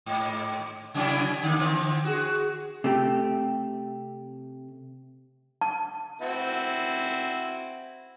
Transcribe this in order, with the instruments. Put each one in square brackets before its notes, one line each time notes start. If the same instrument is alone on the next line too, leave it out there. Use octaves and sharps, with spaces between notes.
[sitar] G#2
C3 F#3 E4
D3 A#3
D3 E3 C4
F#4 G#4
[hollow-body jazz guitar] C3 A3 G4
[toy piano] A5
[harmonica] C4 E4 F#4